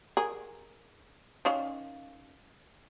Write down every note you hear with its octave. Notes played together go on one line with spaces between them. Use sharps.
G#4 A#4
D#3 C#4 F5